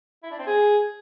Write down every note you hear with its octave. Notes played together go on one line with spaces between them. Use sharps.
E4
D4
C4
G#4